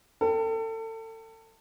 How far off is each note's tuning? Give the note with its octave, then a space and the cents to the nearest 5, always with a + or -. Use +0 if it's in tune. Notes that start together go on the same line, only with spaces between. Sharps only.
A4 +30 G5 -5